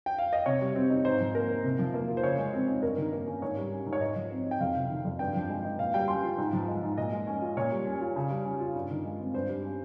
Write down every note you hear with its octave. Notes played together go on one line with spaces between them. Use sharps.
G5
F5
D#5
C3 C#5
G3
C4
D#4
G#2 C5
F3
A#3 A#4
D#4
C3
F3
A#3
F4
C5
C#3 C#5
G#3
C4
D#4
G2 A#4
D#3
A#3
C#4
G#2 C#5
G3
C#4
G#2
C#5
G#2 D#5
F3
C4
D#4
G5
F2 F5
C3
D#3
F2
G2 G5
F3
G#3
D#4
A#2 F5
G3 G5
C#4 C6
F4
G#2
F3
G#3
G#2
A#2 D#5
G#3
C#4
F4
A#2 C#5
G3
C#4
F4
C#3
G3
C#4
F4
G2
D#3
G#3
C4
G2 C5
G3
C#4